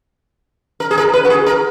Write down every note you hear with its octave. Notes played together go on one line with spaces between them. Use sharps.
A#4
G#4
A#4
B4
F#4
G#4
A#4